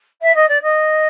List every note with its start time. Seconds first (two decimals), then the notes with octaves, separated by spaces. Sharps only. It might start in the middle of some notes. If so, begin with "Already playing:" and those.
0.21 E5
0.35 D#5
0.48 D5
0.62 D#5